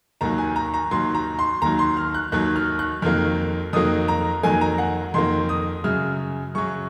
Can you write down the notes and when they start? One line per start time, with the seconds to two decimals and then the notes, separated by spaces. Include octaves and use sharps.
0.21 D#2 D#3 F#3 A#5
0.38 G#5
0.56 A#5
0.74 A#5
0.91 D#2 D#3 F#3 C6
1.15 A#5
1.39 C6
1.62 D#2 D#3 F#3 A#5
1.79 C6
1.97 F6
2.14 F#6
2.32 D#2 D#3 F#3 F#6
2.56 F6
2.79 F#6
3.02 F2 D#3 F#3 A#3 F6
3.73 F2 D#3 F#3 A#3 D#6
4.08 A#5
4.43 F2 D#3 F#3 A#3 G#5
4.61 A#5
4.78 F#5
5.14 F2 D#3 F#3 A#3 C6
5.49 D#6
5.84 F#2 C#3 F#3 F6
6.55 F#2 C#3 F#3 C#6